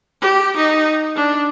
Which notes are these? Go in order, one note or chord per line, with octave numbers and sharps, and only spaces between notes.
G4
D#4
D4